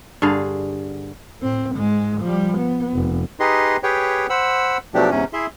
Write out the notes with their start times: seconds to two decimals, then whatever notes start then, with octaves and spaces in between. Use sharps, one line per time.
0.22 G2 D3 G#4 F5
1.40 A2 C4
1.74 G#2 G#3
2.21 F3 G3
2.57 B3
2.95 F1
3.40 D#4 G4 G#4 B4 D#5 C6
3.83 G4 G#4 B4 C#5 G5
4.30 C5 F#5 B5 E6
4.94 B2 F3 F#3 A3 D4 G4
5.10 E2 G#2 C3 C#4
5.33 E4 G#4 E5 C6